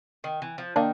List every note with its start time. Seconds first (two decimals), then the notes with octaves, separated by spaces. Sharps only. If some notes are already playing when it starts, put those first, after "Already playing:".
0.24 D#3
0.42 E3
0.58 F3
0.76 D#3 A#3 D4